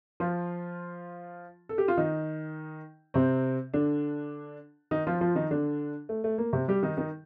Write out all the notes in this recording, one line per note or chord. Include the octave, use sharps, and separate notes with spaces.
F3 F4
A4
G4
F4
D#3 D#4
C3 C4
D3 D4
D#3 D#4
F3 F4
F3 F4
D#3 D#4
D3 D4
A3
A3
A#3
C3 C4
G3 G4
D#3 D#4
D#3 D#4